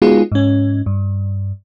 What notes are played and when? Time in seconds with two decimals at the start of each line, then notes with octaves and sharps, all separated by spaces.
0.02 G#3 B3 D#4 F4 F#4 G#4
0.32 G#2 C#4
0.86 G2